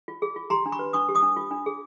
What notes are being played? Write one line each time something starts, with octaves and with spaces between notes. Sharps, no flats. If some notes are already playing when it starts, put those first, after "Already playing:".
F4
G#4
F4
G4 A#5 C6
D4
B5 C#6
B4
D4 C#6 D#6
G4
C#6 D#6
D4
F4
D4
G#4